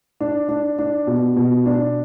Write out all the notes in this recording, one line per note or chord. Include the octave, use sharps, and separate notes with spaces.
D4
D4
D4
B2
B2
D4